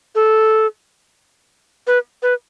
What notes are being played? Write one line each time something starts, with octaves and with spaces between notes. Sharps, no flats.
A4
B4
B4